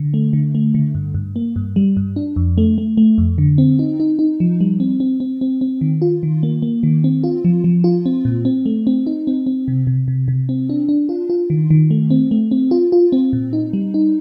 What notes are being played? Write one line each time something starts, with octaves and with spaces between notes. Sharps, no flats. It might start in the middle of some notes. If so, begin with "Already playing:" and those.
Already playing: D3
A3
D3
A3
D3
G2
G2
A#3
G2
G3
G2
D4
F2
A3
A3
A3
F2
D3
C4
D#4
D#4
D#4
F3
G3
C4
C4
C4
C4
C4
D#3
F4
D#3
A#3
A#3
D#3
C4
F4
F3
F3
F4
C4
A#2
C4
A3
C4
D#4
C4
C4
C3
C3
C3
C3
C4
D4
D4
F4
F4
D#3
D#3
A3
C4
A3
C4
F4
F4
C4
A#2
D#4
G3
D#4